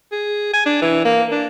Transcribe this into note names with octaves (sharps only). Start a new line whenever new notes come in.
G#4
G#5
D4
E3
A#3
D4